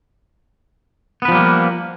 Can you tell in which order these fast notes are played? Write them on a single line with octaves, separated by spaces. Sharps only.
B3 B4 F3 G3 A#3